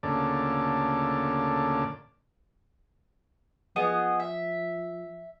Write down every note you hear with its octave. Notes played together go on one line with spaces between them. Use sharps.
D2 A#2 C#3 A4 D5
F3 B3 G#4 D#5
E5